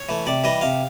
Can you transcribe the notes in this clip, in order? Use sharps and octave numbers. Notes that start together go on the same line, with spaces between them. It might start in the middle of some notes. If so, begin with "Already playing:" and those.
Already playing: C#5
E3 A3
C3 D5
E3 G3 D#5
C3 F5